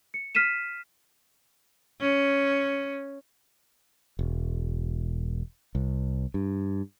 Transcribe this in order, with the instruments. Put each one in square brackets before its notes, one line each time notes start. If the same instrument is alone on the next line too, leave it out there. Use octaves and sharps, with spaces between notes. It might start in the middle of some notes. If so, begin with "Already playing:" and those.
[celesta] C#7
F6 B6 C7 D#7 E7
[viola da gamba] C#4
[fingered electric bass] E1
C2
G2